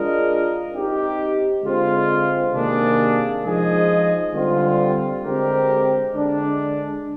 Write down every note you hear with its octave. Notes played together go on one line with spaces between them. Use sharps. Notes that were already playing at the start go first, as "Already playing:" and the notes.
Already playing: G#3 D4 F4 A#4 D#5
C4 D#4 G4
D3 G#3 C4 F4
C3 D#3 A#3 D4 G#4
F3 G#3 D#4 G#4 D#5
D3 G3 C4 F4
D3 G#3 C4 G4 A#4
D3 G#3 D4